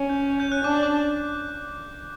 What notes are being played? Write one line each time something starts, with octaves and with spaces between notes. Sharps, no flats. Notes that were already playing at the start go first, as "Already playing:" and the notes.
Already playing: C#4
G6
G6
F#6
D4 D6
D6